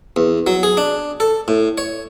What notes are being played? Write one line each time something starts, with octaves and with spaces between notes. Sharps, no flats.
E2
F#3
G#4
D4
A4
A2
C#5